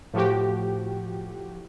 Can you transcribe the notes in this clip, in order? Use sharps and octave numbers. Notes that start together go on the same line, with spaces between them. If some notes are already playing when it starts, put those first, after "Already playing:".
A2 F3 F#4 G4